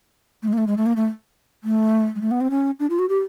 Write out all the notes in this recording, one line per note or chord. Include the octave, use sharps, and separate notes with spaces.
A3
G#3
A#3
A3
G#3
A3
A#3
A3
A3
G#3
A3
B3
C4
C#4
D4
F4
F#4
G4